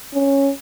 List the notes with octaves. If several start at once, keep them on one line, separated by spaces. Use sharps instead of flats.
C#4